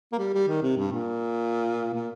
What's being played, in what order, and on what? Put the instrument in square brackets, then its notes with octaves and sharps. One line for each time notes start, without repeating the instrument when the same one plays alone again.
[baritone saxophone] A#3
G3
G3
D#3
C3
G2
A#2
A#2